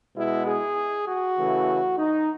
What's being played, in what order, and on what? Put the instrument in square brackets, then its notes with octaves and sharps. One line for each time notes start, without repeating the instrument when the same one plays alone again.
[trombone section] B2 G#3 B3 E4
G#4
F#4
C#3 E3 A3
D#4